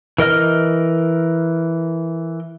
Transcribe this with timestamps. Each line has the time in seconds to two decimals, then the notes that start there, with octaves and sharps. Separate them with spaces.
0.18 E3 A#4 D#5 F6